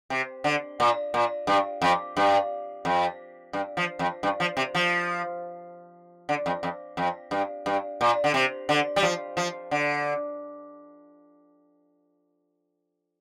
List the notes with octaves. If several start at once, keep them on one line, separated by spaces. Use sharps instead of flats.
C3
D3
A#2
A#2
G2
F2
G2
F2
G2
F3
F2
G2
F3
C3
F3
D3
F2
F2
F2
G2
G2
A#2
D3
C3
D3
G3
F3
F3
D3